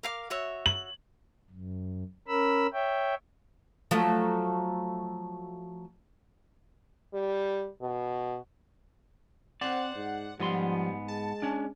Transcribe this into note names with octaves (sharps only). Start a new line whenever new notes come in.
A#4 F5 D6
F#4 C#5 E5
F#7
F#2
C#4 A#4 B5 E6
C#5 E5 G5
F3 F#3 A3
G3
B2
C4 C5 D5 F#5
G#2
G#2 F3 G3 B3 C6
G#3 A5
C#4 D4